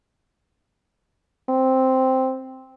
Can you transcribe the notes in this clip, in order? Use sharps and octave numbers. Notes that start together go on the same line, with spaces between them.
C4